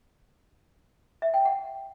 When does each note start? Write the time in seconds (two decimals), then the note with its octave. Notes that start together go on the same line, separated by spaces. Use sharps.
1.22 E5
1.34 G5
1.45 F#5